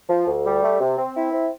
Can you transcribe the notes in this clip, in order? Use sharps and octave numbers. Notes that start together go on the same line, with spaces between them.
F3
D2
G3
A3
C3
C4
E4
C4